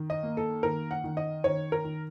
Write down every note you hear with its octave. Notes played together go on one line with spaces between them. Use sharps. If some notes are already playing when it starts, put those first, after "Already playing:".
Already playing: D#3
D#5
A#3
A4
D#3 A#4
F#5
D#3
D#5
D#3 C#5
A#4
D#3